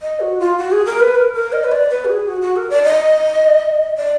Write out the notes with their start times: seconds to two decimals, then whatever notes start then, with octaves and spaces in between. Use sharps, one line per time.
0.02 D#5
0.20 F#4
0.40 F4
0.58 F#4
0.72 G#4
0.86 A#4
1.00 B4
1.15 A#4
1.34 A#4
1.53 D#5
1.64 B4
1.72 D5
1.90 B4
2.05 F#4
2.09 G#4
2.28 F#4
2.42 F#4
2.56 A#4
2.70 D5
2.84 D#5
3.98 D5